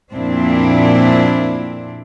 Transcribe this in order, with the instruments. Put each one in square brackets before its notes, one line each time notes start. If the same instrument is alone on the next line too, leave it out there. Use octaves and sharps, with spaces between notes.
[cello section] F2 A#2 C4 D4 E4